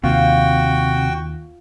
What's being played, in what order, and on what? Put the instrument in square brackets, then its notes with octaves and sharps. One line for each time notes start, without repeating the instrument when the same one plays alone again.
[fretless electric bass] D#2 [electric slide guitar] C3 [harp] F4 [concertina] F#4 G5